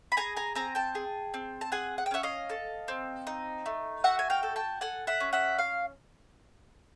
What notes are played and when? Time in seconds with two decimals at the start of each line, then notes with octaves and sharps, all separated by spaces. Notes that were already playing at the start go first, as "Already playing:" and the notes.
0.12 B5
0.17 G#4 G#5 A#5
0.37 G#5 A#5
0.55 C4 G#5 A#5
0.75 G5 A5
0.95 G#4
1.34 C4
1.61 A5
1.72 G#4 F#5 G#5
1.98 F#5
2.06 G5
2.11 C#4 E5 F#5
2.23 D#5 F5
2.50 A4
2.88 C4
3.27 D#4
3.66 A3
4.04 F#4 E5 F#5
4.19 G#5
4.30 F5 G5
4.43 A4
4.56 G5 A5
4.81 A4 F#5 G#5
5.07 E5 F#5
5.20 C#4
5.33 E5 F#5
5.59 F5